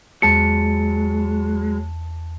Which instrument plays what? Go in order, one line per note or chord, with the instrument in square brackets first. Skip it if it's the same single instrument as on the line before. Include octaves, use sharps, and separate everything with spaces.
[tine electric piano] E2 A5 C#7 [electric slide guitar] F#3 G#3